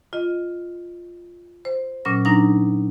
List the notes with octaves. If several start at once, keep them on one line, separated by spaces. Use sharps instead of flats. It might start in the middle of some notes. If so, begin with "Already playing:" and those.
F4 D#5
C5
A#2 F#3 C#4 F6 A#6
F#3 D4 D#4 A#5 A#6